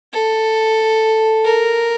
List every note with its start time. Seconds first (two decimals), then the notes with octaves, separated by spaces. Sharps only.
0.13 A4
1.45 A#4